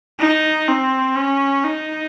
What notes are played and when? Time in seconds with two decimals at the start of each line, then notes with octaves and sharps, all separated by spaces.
0.20 D#4
0.68 C4
1.15 C#4
1.63 D#4